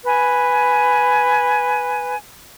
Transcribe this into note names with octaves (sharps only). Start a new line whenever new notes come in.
B4 G#5